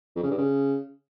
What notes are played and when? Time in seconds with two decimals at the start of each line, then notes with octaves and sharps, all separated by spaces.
0.16 F2
0.23 C#3
0.31 G2
0.38 C#3